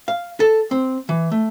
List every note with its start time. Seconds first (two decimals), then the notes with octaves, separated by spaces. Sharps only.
0.08 F5
0.40 A4
0.71 C4
1.09 E3
1.31 A3